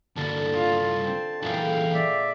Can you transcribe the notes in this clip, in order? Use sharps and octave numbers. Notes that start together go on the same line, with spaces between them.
G2 D3 A#3 A5
F4
C4
C#2 A#2 E3 G#3 A4 F5 G5
D5 E5